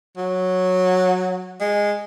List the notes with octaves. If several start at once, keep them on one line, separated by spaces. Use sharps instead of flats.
F#3
G#3